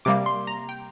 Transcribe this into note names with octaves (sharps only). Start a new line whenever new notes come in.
C3 G3 A#3 D6
C6
A#5
G5